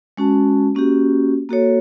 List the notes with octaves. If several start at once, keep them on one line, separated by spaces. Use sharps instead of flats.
G#3 C#4 F#4 A5
A#3 C#4 F#4 G4
A#3 F#4 A4 C#5